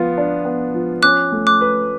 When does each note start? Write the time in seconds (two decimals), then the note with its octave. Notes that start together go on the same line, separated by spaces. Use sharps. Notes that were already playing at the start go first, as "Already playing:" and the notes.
Already playing: F3 B3 F4
0.17 D4
0.45 B3
0.74 F3
1.02 C#4 D6 F#6
1.32 A3
1.47 D6 F#6
1.61 B4